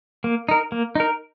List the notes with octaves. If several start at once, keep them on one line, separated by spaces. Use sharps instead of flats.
A#3
D#4 A#4
A#3
D#4 A#4